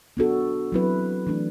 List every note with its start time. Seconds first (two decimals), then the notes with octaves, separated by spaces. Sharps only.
0.17 B3 D4 F#4 A4
0.72 F#3 C4 E4 B4
1.27 E3 A3 D4